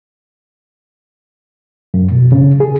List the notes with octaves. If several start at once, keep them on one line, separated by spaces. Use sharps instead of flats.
F#2
B2
C#3
G#4